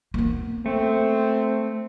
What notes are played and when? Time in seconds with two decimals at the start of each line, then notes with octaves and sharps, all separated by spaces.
0.14 A#3 B3
0.66 A3 C4